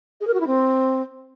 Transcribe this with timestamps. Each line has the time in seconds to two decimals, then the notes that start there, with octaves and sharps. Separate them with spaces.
0.21 G#4
0.27 A#4
0.34 F#4
0.40 E4
0.47 C4